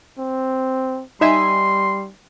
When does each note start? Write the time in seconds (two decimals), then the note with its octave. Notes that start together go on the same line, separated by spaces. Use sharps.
0.19 C4
1.21 G3 D#4 E5 G#5 C6